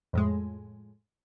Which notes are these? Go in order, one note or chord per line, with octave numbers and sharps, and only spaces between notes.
F2 A2 G#3